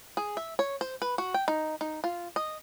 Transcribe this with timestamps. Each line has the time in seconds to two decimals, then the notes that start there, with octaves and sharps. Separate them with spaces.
0.17 G#4
0.37 E5
0.59 C#5
0.81 C5
1.02 B4
1.18 F#4
1.34 G5
1.48 D#4
1.81 D#4
2.04 F4
2.36 D#5